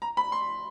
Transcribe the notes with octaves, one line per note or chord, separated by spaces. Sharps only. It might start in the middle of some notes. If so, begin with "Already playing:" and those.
A#5
B5
C6